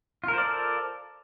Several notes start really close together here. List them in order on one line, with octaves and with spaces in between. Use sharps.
F4 A#4 C5 D5 A4